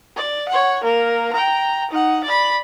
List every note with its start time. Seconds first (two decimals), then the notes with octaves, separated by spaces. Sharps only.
0.16 D5
0.49 C#5 F#5
0.83 A#3 A#4
1.32 G5 A#5
1.91 D#4 F#5
2.24 D5 B5